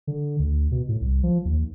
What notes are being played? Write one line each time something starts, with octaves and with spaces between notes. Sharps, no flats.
D3
D2
B2
A2
C2
F3
D#2